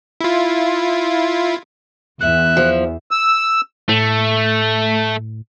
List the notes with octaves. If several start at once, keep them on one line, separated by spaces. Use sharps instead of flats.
E4 F4
E2 E5 F#6
F3
E6
A2 A3